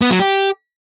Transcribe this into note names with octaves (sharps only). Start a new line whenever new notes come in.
B3
F#3
G4